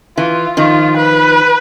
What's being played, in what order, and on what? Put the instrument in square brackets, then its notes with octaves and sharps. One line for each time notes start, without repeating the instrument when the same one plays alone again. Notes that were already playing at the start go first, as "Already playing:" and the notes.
[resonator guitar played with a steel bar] E3 [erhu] F4
[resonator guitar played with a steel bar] D#3 F3 [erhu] F4
[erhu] B4